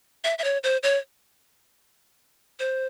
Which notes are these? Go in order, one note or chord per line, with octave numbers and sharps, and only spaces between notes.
E5
E5
C#5
C5
C#5
C5